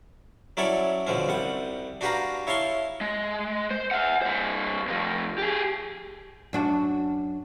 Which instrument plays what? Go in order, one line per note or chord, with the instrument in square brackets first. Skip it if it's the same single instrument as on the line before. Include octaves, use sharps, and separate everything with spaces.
[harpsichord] F#3 C#4 E4 A4 C#5 D5
B2 D3 F3 C#4
C2 G3 F#5
D4 F#4 G4 B4 F5 A#5
E4 C#5 F5 A5 C6 C#6
[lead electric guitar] G#3
C5
E5 F#5
G2 C5
C3 F3
G4 G#4
[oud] F#2 D4 F#4